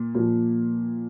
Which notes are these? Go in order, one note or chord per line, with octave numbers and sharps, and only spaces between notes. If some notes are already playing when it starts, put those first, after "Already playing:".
Already playing: A#2
A#2 F3